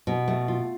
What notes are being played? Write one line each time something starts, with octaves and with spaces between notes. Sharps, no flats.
B2
A3
F4